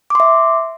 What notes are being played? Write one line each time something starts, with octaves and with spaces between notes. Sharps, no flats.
E5 C6 D6